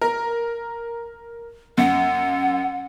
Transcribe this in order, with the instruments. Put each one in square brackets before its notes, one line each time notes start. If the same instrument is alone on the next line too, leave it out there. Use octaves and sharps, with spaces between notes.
[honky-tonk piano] A#4
[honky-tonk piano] F#2 [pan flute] F#5